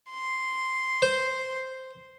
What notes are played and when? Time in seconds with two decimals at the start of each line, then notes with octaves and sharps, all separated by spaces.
0.10 C6
1.02 C5